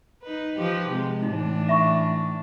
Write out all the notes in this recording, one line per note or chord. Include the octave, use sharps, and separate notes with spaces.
D#4 B4
F3 G4 B4
C3 G#3
A2 E3 D4 D#4
E5 B5 C#6